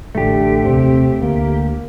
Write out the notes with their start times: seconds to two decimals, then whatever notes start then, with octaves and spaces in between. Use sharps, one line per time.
0.15 A1 D3 A3 G4
0.64 D#1 C3 C4
1.21 D2 A#3